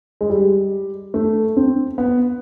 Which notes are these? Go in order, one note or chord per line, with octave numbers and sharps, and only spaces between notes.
G#3
G3
A3
C4
B3